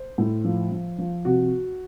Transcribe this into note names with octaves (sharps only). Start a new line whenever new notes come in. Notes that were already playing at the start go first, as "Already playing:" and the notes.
Already playing: C5
A2
F3
F3
F3
C3 F#4